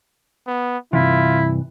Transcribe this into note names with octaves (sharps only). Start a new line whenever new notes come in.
B3
G2 C3 E3 E4 F4